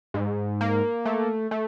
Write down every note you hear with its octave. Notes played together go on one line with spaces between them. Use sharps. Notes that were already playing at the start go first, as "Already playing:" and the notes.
G#2
A#3
A3
A3